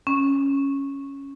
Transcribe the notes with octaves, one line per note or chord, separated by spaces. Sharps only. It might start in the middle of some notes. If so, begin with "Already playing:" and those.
C#4